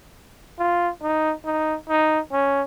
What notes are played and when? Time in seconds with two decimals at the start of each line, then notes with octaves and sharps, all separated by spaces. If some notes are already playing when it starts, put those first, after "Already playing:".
0.59 F4
1.02 D#4
1.45 D#4
1.89 D#4
2.32 C#4